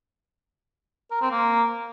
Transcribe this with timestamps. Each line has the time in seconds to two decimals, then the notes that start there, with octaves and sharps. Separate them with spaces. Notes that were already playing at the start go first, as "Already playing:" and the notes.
1.11 A#4
1.21 C4
1.31 A#3